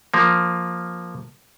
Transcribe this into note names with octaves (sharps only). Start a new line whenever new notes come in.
F3 A#3